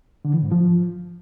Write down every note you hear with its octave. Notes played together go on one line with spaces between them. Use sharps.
D3
E3
G#2
F3